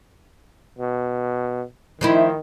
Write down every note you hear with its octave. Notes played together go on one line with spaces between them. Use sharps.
B2
D#3 F3 D#4 E4